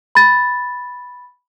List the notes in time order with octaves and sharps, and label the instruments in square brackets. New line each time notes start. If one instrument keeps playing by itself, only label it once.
[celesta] B5 A6